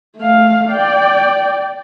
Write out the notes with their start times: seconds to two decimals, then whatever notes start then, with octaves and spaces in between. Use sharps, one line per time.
0.17 A3 F5
0.71 D5 G5